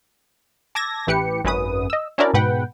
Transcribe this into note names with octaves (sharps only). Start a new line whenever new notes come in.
A5 D6 E6 G#6 A#6
A1 E3 G4 B4 G5 C#7
G#1 F#2 C#4 B4 D#6
D#5 E6
C#4 D4 E4 F#4 A#4 D5
G#2 B2 B4 F#5 G5